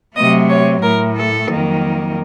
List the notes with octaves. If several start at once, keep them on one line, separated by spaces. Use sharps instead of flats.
C3 F#3 A3 D#5
C#5
A2 A3 A#4
A4
F2 D#3 F#3 A#3